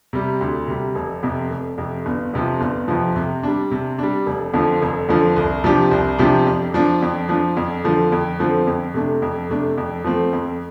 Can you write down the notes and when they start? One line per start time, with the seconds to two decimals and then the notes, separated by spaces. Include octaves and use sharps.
0.13 C3 G3
0.41 D2
0.68 C3 G3
0.95 F1
1.23 F2 C3
1.50 F1
1.78 F2 C3
2.06 G1
2.34 F2 C3 F3
2.61 G1
2.88 F2 C3 F3
3.16 C3
3.43 G3 D4
3.71 C3
3.99 G3 D4
4.26 F1
4.54 F2 D3 F3
4.82 F1
5.09 F2 D3 F3
5.36 C2
5.64 C3 F3 D4 G4
5.91 C2
6.19 C3 F3 D4 G4
6.46 F2
6.74 F3 D4
7.02 F2
7.29 F3 D4
7.57 F2
7.84 D3 F3 C4
8.12 F2
8.40 D3 F3 C4
8.67 F2
8.94 C3 A3 D4
9.22 F2
9.50 C3 A3 D4
9.78 F2
10.04 F3 A3 C4
10.33 F2